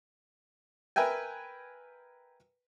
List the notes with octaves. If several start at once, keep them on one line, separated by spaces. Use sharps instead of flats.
A#4 B4 E5 G5 G#5